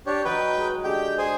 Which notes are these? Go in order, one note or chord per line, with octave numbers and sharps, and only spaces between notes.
D4 G4 C#5
F#3 D#4 B4 C#5 G5
G#3
D3 G#3 G4 G#4 G5
G#4 C5 G#5